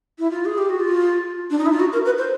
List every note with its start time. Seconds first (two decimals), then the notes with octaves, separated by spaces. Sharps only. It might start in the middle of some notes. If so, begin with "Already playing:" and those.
0.19 E4
0.31 F4
0.45 G#4
0.58 G4
0.69 F#4
0.80 F4
1.50 D4
1.59 D#4
1.66 E4
1.72 F4
1.80 F#4
1.93 A#4
2.06 B4
2.18 C5